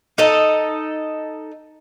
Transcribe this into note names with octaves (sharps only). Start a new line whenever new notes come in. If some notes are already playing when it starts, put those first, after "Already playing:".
D#4 A4 D#5